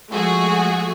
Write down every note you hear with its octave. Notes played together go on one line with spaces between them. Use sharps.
F3 G#3 A3 F#4 G#4